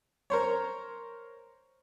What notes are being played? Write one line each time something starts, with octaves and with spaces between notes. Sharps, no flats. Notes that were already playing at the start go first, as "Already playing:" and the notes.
A#4 C5 C#5